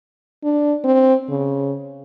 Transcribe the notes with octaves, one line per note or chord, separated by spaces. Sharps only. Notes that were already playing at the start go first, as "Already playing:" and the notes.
D4
C4
C#3